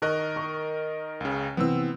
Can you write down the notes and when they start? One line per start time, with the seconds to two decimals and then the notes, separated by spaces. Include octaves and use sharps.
0.02 D#3 A#4 D#5 C#6 F#6
0.36 C#6
1.21 C#2 C#3
1.57 C3 E3 B3 C4 E6